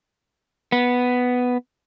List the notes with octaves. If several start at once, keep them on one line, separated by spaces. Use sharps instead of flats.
B3